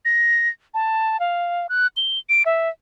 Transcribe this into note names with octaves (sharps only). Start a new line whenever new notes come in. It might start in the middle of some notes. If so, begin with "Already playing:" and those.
A#6
A5
F5
F#6
G7
D7
E5